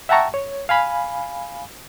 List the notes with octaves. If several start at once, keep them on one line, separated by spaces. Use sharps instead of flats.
E5 F#5 G5 A5 A#5 C#6
C#5
F5 G#5 B5